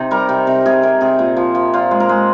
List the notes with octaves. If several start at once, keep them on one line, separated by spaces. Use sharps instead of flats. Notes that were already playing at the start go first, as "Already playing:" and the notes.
Already playing: C3 D#4
G3 A#4
C3
C3
C3 G#4
C3 A#4
C3 G#4
A#2
F3
F3
A#2 F4
G#3
A#4
G#3